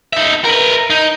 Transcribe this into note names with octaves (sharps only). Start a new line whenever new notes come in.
D#4 E5
A#4 B4
D#4